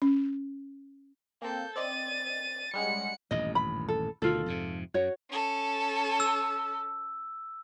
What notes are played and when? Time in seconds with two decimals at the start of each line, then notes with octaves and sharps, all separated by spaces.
0.02 C#4
1.42 A#3 C4 A4 G6
1.76 C4 D5 D#5 A6 D#7
2.74 G3 G#3 C#4 F#5 C#7
3.31 D#1 A1 G2 D#5
3.55 B5
3.89 A4
4.22 D2 B2 D#3 F4 A4
4.46 F2 G#2 C3
4.94 F#2 F#4 C#5
5.31 C#4 A4
6.20 E6